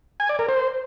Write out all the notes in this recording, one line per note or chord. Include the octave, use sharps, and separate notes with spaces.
G#5
D5
A#4
C5